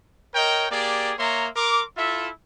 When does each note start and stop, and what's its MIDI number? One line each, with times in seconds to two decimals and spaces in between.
0.35 0.66 70
0.35 0.66 73
0.35 0.66 75
0.35 0.66 79
0.71 1.12 58
0.71 1.12 67
0.71 1.12 68
0.71 1.12 74
1.18 1.48 58
1.18 1.48 73
1.18 1.48 76
1.18 1.48 82
1.18 1.48 84
1.56 1.82 70
1.56 1.82 84
1.56 1.82 86
1.97 2.29 64
1.97 2.29 65
1.97 2.29 69
1.97 2.29 76